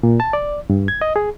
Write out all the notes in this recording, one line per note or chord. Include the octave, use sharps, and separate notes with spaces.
A#2
A5
D5
G2
G#6
D#5
G#4